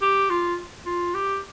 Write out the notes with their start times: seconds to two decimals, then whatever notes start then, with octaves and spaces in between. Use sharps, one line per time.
0.01 G4
0.30 F4
0.86 F4
1.14 G4